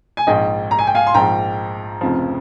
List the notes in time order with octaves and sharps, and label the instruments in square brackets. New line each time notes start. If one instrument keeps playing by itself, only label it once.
[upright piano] G#5
[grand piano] A#1 G#2 F3 [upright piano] D#5 G5
[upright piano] A#5
G#5
G5
F5 G#5
C6
[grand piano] A#1 G#2 F3 [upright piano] G5 A#5
[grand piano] F1 F2 C#3 F3